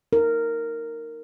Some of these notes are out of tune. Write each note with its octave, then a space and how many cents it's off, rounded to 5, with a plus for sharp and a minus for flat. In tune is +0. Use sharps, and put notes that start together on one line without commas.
D#4 +0 A#4 -10